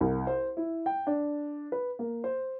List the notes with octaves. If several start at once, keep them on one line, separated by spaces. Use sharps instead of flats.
C2
C5
E4
G5
D4
B4
A#3
C5